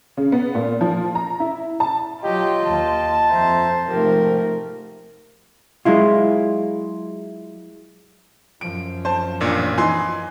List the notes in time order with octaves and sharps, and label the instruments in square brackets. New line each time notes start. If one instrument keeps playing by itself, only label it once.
[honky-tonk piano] C#3
B3
A#2
F3
A#5
E4
A5
[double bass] F#3 [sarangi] F4 [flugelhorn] G4 [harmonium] D#5 G5
[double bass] D#2 [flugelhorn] A5
[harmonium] F2 E5 A#5 [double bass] F3 [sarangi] C5
[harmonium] G#2 C3 G4 [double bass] F3 A3 [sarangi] A#4
[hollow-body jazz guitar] F#3 G#3 E4 F4
[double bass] F#2 F3 [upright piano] D7
[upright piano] C5 A5
[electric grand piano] A1 A#2 [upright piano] D4
[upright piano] E3 D#4 [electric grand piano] G#5 C6